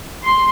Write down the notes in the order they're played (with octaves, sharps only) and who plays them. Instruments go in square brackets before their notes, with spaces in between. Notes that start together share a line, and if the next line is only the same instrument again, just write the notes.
[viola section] C6